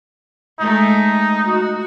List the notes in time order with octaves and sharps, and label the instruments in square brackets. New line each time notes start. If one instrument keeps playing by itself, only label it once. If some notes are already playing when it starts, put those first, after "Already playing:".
[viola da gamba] G#3 A3 [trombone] D#4
[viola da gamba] F#4